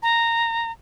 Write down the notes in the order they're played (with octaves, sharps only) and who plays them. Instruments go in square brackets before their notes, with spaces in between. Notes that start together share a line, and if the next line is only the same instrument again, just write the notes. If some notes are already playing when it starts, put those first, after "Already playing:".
[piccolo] A#5